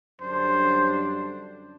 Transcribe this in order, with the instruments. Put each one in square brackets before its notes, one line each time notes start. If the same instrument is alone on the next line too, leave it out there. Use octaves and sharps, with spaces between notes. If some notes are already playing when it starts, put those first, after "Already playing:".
[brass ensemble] F#2 D3 G3 D4 [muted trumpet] C5